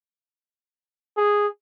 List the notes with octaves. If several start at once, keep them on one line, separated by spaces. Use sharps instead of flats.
G#4